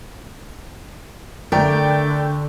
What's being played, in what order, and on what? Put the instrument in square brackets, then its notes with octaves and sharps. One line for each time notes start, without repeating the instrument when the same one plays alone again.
[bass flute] D3 [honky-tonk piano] A3 G5 [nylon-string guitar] A#4 [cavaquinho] D5